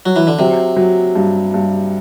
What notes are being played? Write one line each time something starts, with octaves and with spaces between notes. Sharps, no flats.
F#3
E3
D3
C3 F#3
F#3
G2
G2